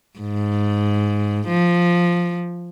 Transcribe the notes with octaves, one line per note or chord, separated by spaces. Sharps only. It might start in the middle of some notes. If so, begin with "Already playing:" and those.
G#2
F3